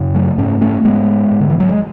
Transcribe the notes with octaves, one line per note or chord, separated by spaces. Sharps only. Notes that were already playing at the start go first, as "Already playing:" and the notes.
Already playing: F#2 C#3
F#3 A3
G#2 A3 C#4
A3 C#4
G#2 G#3 B3
G#2
D3
E3
F#3
G#3